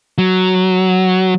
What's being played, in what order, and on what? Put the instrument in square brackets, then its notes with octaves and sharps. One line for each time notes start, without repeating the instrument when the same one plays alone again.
[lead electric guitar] F#3